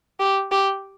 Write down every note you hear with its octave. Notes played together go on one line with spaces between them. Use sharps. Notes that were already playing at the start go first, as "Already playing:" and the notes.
G4
G4